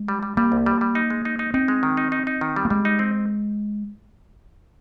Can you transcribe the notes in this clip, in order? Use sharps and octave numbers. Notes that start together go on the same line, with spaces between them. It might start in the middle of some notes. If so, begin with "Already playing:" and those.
Already playing: G#3
G3
G3
G3 A#3
C2
G3
G3
D#4
G#3
D#4
D#4
C4 D#4
G#3
D#3
D#4
D#4
D#4
D#3
G3
A#3
G3 G#3
D#4
C4